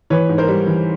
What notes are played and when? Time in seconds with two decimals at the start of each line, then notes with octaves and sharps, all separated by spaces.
0.10 E3 B4 C#5
0.29 G#2
0.38 A#4 C5
0.48 G3
0.67 E3